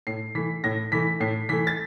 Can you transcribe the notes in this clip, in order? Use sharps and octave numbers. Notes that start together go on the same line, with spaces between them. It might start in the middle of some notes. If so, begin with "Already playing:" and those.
A2 C7
E3 A3 B6
A2 A#6
E3 A3 B6
A2 C7
E3 A3 B6
A6